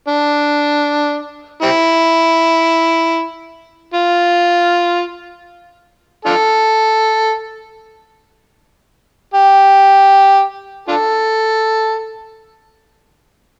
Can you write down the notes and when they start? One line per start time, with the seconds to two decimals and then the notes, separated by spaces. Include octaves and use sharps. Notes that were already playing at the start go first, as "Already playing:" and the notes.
0.08 D4
1.63 G3 C4 E4
3.94 F4
6.26 D4 F4 A4
9.34 G4
10.88 D4 F4 A4